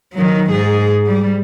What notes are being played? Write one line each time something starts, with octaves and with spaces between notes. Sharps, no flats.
D#3 F#3
G#2 G#4
G3